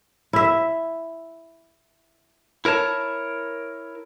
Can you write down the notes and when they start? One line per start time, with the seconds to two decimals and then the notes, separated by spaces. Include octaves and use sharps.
0.33 E4 E5
2.65 E4 A#4 C#5 A5